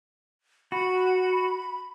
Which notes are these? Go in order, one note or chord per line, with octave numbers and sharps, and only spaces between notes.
F#4 B5